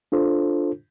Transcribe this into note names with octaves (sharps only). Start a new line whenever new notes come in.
D4 F4 A4 C5